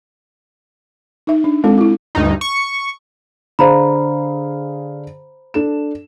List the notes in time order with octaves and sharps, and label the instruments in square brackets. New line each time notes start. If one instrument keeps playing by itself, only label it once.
[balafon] D#4 E5
D4
G#3 C4 F4 A4
E4 F4
[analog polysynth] D2 G2 D#4
C#6
[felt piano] D3 G#4 F5 [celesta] C5 A#5 B5
[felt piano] D4 A4 E7